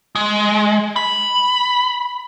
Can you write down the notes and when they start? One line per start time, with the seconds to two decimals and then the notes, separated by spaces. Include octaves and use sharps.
0.15 G#3
0.96 B5